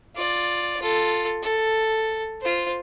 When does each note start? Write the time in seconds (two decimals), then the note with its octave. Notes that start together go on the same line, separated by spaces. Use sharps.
0.15 F4 D5
0.80 F4 A4
1.42 A4
2.41 F4 C5